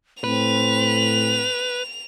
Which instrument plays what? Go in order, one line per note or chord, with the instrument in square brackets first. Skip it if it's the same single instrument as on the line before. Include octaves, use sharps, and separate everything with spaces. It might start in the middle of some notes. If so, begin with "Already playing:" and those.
[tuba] A2 [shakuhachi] C4 [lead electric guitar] B4 [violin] F7